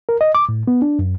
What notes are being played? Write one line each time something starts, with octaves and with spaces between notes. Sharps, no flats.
A#4
D#5
D6
A2
B3
D4
F#2